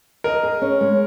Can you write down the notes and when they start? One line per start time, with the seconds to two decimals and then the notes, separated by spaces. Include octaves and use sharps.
0.24 A#4 D#5
0.43 G#4
0.62 C#4
0.81 G#3